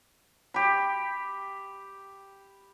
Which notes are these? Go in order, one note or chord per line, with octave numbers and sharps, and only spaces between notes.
G4 B5